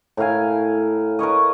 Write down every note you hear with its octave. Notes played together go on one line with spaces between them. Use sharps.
A2 A#4 F5 G#5
A#4 B4 C#5 D#5